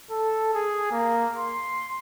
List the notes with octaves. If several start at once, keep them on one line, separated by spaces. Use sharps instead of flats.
A4
G#4
A#3
C6